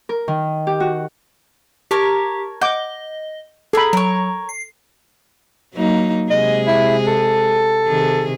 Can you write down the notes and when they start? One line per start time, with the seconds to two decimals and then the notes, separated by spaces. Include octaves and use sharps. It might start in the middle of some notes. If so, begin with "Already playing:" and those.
0.09 A#4
0.28 D#3
0.67 G4
0.80 F#4
1.91 G4 A#4 C#5 A5
2.61 D#5 F#5 D6 G6
3.73 G#4 A4 G#5 A#5 B5
3.93 F#3 A#4 C#5
4.49 C7
5.73 F#3 A#3 D#4
6.30 C3 G#3 G#4 D#5
6.67 E4
7.07 A4
7.87 C3 D#3 G#4